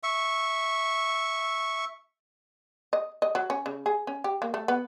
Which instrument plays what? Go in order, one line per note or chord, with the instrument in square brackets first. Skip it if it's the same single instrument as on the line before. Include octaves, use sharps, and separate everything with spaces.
[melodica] E5 C#6
[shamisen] D#5
D#5
F#3
C#4
C#3
G#4
C#4
G4
A#3
A3
B3